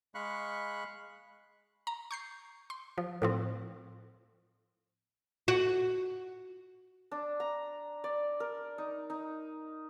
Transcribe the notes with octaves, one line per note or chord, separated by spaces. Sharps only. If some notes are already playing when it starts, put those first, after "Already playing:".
G#3 F5 B5 C#6 F#6
A#5
C#6 G6 C7
C6
F3
A2 F3 C4
F#4
D4
A#5
D5
A#4
D#4
D#4